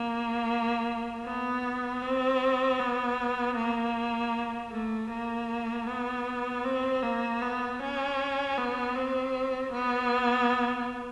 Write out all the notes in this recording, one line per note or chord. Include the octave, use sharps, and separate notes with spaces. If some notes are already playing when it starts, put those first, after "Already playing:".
Already playing: A#3
B3
C4
B3
A#3
A3
A#3
B3
C4
A#3
B3
C#4
B3
C4
B3